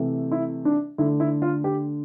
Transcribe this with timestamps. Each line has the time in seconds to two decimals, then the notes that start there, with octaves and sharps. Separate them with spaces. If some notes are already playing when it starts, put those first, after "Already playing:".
Already playing: C3 E3 A3
0.32 E4
0.65 D4
0.98 D3 A3 E4
1.20 E4
1.42 F4
1.64 G4